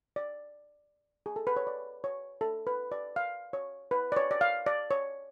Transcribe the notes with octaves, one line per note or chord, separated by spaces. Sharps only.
D5
G#4
A4
B4
C#5
D5
C#5
A4
B4
D5
F5
C#5
B4
D5
C#5
D5
F5
D5
C#5